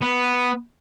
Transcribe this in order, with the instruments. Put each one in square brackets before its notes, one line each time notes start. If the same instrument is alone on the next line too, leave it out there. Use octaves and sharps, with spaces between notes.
[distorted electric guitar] B3